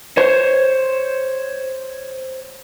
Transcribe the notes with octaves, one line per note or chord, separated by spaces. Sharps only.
C5 C#5